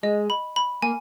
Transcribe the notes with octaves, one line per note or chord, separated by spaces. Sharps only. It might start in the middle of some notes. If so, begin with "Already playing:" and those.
G#3 D#5
B5
B5
A#3 G#5